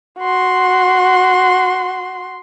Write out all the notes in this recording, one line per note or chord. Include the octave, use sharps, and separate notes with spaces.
F#4 C6